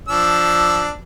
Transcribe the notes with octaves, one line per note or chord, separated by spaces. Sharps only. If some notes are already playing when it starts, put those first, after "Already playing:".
F3 D4 E6